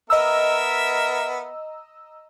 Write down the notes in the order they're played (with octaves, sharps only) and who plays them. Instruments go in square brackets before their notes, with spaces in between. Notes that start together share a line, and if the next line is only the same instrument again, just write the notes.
[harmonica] B3 A#4 E5 [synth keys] D#5 A#5 E6